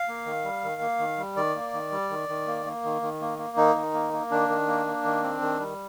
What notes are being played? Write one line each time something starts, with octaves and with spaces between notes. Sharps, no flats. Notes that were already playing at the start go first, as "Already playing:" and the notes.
Already playing: F5
A#3
D#3
G3
D#3
A#3
D#3
G3
D#3 D5
A#3
D#3
G3
D#3
D#3
A#3
A#3
D#3
D#3
A#3
A#3
D#3 D#4
D#3
A#3
A#3
D#3 D4
D#3
A#3
A#3
D#3
C4
D#3
G3